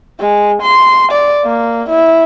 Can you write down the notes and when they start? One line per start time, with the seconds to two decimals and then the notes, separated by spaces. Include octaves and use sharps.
0.20 G#3
0.62 C6
1.11 D5
1.45 A#3
1.89 E4